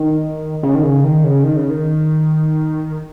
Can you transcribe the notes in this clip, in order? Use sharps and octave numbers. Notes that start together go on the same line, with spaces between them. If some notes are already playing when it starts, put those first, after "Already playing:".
Already playing: D#3
C#3
D#3
C#3
D#3
C#3
D#3
C#3
D#3